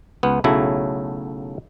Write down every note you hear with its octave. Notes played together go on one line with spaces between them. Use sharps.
C#2 B3
B1 C#3 F#3 A3 E4